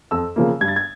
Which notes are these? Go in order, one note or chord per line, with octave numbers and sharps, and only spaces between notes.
F2 E6
C#3 F3 A#3
G2 G#6
A6
G#6